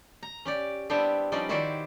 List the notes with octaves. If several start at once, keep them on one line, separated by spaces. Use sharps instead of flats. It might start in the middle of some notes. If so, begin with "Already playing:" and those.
A#5
C#4 G4 D5
G3 B3 C4 D4 E4 G4
F3 G3 C#4 D#4 D5
D#3 E4 F#4 G4 C5 D5